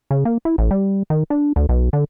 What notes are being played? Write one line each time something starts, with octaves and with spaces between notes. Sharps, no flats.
C#3
A#3
E4
A1
G3
D#3
D4
D2
B1
D3